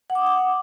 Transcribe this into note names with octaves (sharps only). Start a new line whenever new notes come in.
F#5
D6
D#6
F#5